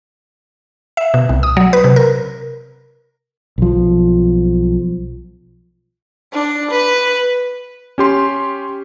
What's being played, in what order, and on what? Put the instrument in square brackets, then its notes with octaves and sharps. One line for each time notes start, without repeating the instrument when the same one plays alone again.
[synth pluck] E5
B2
C2
D#6
F#3
B4
C3
A#4
[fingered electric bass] B1 F3
[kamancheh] D4
B4
[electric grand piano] C#4 G4 C6